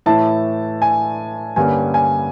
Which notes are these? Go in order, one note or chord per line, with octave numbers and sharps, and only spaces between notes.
A2 E3 A3 A5
G#5
G2 D3 G3 A#3 C#4 G#5
G#5